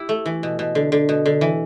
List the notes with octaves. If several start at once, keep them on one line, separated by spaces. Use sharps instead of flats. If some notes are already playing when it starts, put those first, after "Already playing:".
Already playing: E4 G4
A3
E3
B2
B2
D3
D3
B2
D3
E3